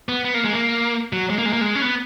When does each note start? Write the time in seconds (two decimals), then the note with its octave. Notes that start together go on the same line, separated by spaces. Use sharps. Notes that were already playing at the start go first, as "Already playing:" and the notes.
0.09 B3
0.25 B3
0.34 A#3
0.44 G#3
0.53 A#3
1.13 F#3
1.30 G#3
1.38 A#3
1.46 G#3
1.53 A#3
1.61 G#3
1.75 C#4
1.82 B3